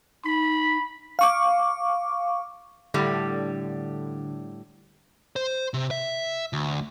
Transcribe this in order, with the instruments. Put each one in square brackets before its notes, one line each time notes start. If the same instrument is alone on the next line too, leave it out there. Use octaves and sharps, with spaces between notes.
[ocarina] D#4 [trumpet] B5
[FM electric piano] F5 C#6 D6
[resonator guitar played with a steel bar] A2 G3 [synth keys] D3
[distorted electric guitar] C5
C3
E5
D2